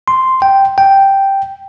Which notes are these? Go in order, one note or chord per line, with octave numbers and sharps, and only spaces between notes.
C6
G5
G5